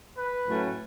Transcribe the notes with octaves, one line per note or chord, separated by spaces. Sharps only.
B4
A2 F#3 A3 C#4